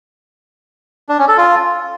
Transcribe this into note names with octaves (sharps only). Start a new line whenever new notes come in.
D4
C#4
A4
F4